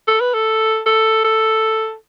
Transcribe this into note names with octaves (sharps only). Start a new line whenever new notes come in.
A4
B4
A4
A4
A4